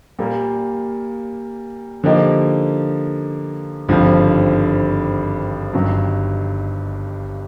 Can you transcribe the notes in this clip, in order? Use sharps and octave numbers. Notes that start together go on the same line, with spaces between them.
A#2 G3 A#3
D3 F3 A#3 D#4 G4
G#1 G2 D3 F3
G1 G2 D#3 F#3